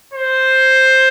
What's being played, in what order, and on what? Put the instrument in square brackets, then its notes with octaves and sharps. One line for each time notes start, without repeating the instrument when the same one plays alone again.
[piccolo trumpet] C5